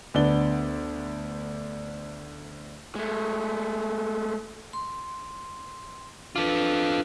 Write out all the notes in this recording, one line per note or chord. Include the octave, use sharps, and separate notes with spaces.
D2 B3 D4 G7
G#3 A3
C6
D4 F4 A4 B4